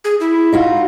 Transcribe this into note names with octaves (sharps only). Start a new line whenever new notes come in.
G#4
E4
D#4 F4 F#4